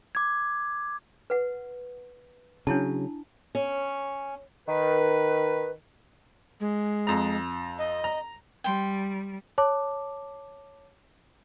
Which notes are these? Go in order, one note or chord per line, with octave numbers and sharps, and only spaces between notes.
D6 G#6
B4 F#5
C#3 F#3 D4 E4 A5
C#4
D#3 B4
G#3
F2 A#5
D#5
A#5
G3 G5 C6
C#5 A5 D6